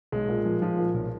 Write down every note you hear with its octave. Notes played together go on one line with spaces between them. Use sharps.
B1 G#3
A#2
F3
F3
A#2
B1